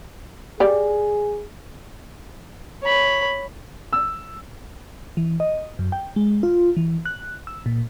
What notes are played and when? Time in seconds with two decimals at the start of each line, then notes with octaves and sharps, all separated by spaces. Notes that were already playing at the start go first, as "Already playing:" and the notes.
0.60 G4 G#4 D5
2.83 C#5 B5
3.93 E6
5.17 E3
5.40 D#5
5.79 F#2
5.92 G5
6.16 G#3
6.43 F4
6.77 E3
7.05 F#6
7.47 E6
7.66 A#2